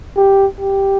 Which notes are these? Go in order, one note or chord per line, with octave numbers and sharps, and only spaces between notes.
G4
G4